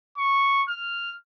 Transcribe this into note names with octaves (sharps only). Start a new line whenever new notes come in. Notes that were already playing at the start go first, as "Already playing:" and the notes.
C#6
F6